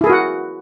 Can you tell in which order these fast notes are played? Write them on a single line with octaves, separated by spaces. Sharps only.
E4 G#4 A#4 F#4 F#5